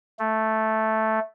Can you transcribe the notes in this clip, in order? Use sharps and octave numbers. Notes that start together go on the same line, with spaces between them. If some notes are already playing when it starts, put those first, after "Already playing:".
A3